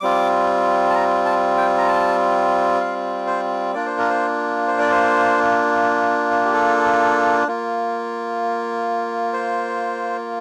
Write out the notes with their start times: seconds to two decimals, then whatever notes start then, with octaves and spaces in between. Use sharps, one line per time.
0.01 G3 C4 F4 D6
0.90 A5
0.95 A#5
1.25 A5
1.57 G5
1.78 A#5
1.88 A5
2.80 F5
3.27 C5
3.74 A#3 D4 F4 D5
3.86 C5
3.98 A#4
4.10 C5
4.67 C5
4.79 D5
4.91 C5
6.45 G4
6.54 A4
7.47 A#3 F4
9.33 C5